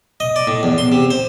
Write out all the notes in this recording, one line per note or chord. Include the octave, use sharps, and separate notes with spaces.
D#5
D5
A2
E2
C6
C3
C5